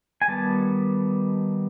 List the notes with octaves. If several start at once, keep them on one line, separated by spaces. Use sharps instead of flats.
G#5
D#3 G3 B3 A5